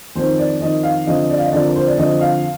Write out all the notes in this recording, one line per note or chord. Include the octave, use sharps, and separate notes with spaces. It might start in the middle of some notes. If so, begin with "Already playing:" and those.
F2 D#3 C5
D5
F2 D#3 D#5
F5
F2 D3 F3 D#5
D5
F5
D#5
F2 D3 F3 D5
A#4
C5
D5
F2 D3 F3 D#5
F5